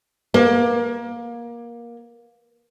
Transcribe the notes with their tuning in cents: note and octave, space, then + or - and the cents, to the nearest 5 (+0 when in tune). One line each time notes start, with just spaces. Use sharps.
A#3 +20